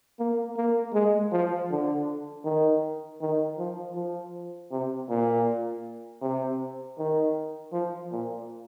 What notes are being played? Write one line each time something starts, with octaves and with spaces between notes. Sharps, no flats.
A#3
A#3
G#3
F3
D3
D#3
D#3
F3
F3
C3
A#2
C3
D#3
F3
A#2